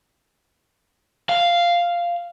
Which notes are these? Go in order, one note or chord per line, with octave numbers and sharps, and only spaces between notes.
F5